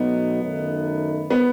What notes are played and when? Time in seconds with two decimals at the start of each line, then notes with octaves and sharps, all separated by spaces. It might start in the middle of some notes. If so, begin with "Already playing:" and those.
Already playing: B2 F#3 A3 B3 D#4
0.43 F#2 D#3 A3 D#4
1.30 B3